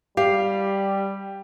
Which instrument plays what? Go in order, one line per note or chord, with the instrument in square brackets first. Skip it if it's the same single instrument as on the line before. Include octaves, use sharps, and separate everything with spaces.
[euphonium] G3 [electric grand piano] G4 [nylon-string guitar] F5